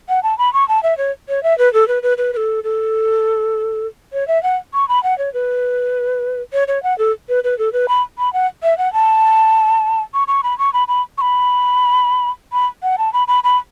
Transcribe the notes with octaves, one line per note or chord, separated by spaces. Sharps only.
F#5
A5
B5
C#6
A5
E5
C#5
C#5
E5
B4
A4
B4
B4
B4
B4
A4
A4
C#5
E5
F#5
C#6
B5
F#5
C#5
B4
C#5
C#5
F#5
A4
B4
B4
A4
B4
B5
B5
F#5
E5
F#5
A5
C#6
C#6
B5
C#6
B5
B5
C#6
B5
B5
F#5
A5
B5
B5
B5